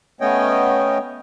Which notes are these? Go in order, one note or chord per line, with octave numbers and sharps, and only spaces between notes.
A3 B3 C#4 C#5 D#5 G5